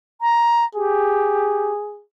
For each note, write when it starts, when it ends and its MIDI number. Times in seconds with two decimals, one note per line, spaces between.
0.21 0.64 82
0.75 1.72 67
0.75 2.03 68